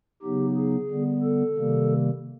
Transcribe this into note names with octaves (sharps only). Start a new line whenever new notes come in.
C#3 F#3 B3 D#4 G4
G#4
D3 G3 B3
A4
C3 D#3 G3 A#3